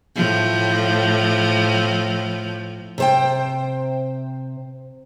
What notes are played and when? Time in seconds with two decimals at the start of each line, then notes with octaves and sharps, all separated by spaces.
0.16 A2 F3
2.98 C3 C5 G5